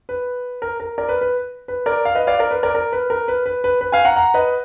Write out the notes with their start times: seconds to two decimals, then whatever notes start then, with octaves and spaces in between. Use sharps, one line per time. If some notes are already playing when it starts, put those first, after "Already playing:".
0.09 B4
0.62 A#4
0.80 A#4
0.98 A#4 D5
1.09 B4
1.21 B4
1.68 B4
1.86 A#4 D5
2.05 F5
2.15 B4 D#5
2.27 D5 F5
2.39 A#4 D5
2.51 B4
2.63 A#4 D5
2.75 A#4
2.92 B4
3.10 A#4
3.28 B4
3.46 B4
3.64 B4
3.81 B4
3.92 F5 G#5
4.05 F#5 A#5
4.16 F#5 A#5
4.34 B4 D#5